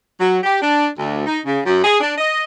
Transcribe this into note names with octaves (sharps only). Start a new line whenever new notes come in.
F#3
G4
D4
D2
D#4
C#3
F#2
G#4
D4
D#5